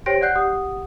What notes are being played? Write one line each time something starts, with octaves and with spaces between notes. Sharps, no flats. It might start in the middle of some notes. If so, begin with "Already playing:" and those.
G4 C5 C#5 G5 A#6 D7
D5 F#5 F#6 G6 C7
G4 F#5 D#6